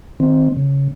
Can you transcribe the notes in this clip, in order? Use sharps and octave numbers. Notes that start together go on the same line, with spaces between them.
D#3 C4
C#3